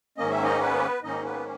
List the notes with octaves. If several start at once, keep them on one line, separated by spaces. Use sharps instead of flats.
G#2 D#3 A#3 C#4 D#5
E5
D#4 D#5
B3 B4
G#2 D#3 A#3 C#4 D#4 D#5
B3 B4